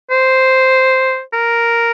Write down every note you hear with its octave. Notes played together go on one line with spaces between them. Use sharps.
C5
A#4